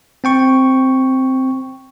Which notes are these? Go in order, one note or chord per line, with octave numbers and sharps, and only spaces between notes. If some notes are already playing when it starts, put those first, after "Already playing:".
C4 G5 C#6